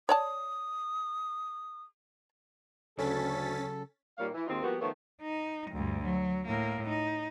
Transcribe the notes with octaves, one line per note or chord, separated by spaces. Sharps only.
C#5 D5 A5 D#6
D2 C#3 F#3 C#4 A4 A6 B6
A#2 D#3 G3 A#3 C#5 F5
E3
D#2 G#2 D#3 C4 D#4 F4
F3 G3 A#3 B3 F#4
D#3 F3 A3 B3 F4 C#5
D#4
D2 G2
F#3
A2 A#3
D#4